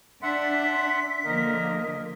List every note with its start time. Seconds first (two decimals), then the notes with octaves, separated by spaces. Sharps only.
0.23 D4 E5 F#5 C6 B6
1.25 D3 F3 A#3 A#4 D#5